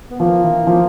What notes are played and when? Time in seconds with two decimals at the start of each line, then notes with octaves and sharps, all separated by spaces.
0.10 B3
0.20 F3 A#3
0.44 E3
0.67 F3